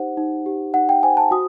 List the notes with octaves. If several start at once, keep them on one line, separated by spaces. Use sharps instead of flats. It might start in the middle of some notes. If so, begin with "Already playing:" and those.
Already playing: D#4 G4 C5 F#5
D#4
G4
D#4 F#5
G5
C5 G#5
A5
F#4 D#6